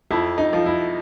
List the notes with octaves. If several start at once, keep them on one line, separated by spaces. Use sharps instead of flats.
F2 E4
D#4
F3
E4